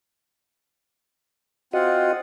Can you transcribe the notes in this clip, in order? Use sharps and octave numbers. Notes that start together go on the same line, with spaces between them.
C4 F4 F#4 D#5 F#5